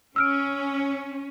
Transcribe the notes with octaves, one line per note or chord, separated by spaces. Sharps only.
C#4 E6 F6 D7